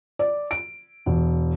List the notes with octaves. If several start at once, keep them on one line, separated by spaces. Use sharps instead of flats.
D5
D7
E1